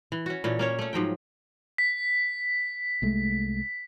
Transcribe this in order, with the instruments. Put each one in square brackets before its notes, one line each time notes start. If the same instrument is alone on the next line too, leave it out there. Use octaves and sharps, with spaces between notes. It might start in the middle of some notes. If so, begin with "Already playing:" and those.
[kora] E3
C#4 F#4
A#2 E3 C#4 A4
A#3 C#4 C#5
A3 C#4
G#2 F3 F#3 G5
[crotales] B6
[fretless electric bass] C2 G#3 A3